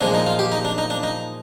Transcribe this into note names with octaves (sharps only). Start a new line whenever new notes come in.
A#2 F3 G#3 D4
D#4
F4
G4
D#4
D4
D#4
D4
D#4